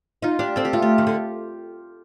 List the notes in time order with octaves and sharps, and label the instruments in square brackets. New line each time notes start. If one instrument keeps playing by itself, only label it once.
[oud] D#4 [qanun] F4
[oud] D4 [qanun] G4
[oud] C4 [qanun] A4
[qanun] G4
[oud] A3 [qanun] F4
[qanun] G4
[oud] D#3
D3